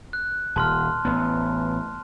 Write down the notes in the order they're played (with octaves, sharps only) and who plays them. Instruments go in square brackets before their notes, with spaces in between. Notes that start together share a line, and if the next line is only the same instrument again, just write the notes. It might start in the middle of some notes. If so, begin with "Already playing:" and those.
[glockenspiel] F#6
[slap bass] D#1 [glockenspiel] A5 C6 F6
[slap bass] A1 B3